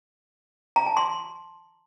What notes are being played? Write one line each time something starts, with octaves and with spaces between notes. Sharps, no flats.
A#5
A5
C6